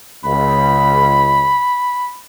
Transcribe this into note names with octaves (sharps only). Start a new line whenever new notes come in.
C#2 B5